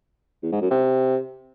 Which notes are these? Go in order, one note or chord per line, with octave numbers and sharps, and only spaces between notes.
E2
G#2
F#2
C3